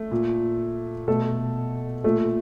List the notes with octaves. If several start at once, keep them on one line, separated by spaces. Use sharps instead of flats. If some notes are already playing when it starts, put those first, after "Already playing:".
Already playing: A3
A#2
B2 A3 A4
A#2 A3 A4